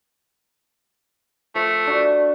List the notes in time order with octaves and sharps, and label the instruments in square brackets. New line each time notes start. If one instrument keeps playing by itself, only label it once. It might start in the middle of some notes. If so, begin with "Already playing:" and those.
[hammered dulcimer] F3 [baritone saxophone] A3
[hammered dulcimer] D4 F#4